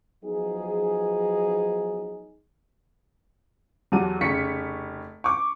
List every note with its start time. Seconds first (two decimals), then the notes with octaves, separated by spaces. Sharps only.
0.24 F3 F#3 B3 D#4 G#4
3.92 E2 F#3 G4 F#5 A5 D#7
4.21 F1 C#3 C#6 B6 C#7
5.24 C#6 D6